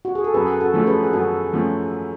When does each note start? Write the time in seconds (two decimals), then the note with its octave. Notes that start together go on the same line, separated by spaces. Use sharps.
0.05 F#4
0.15 G#4
0.24 A4
0.34 F#2 G#4 B4
0.60 F#4 A4
0.74 F3 A3 C#4
0.87 G#4 B4
1.03 G#4
1.13 F#2 F#4 A4
1.53 F3 A3 C#4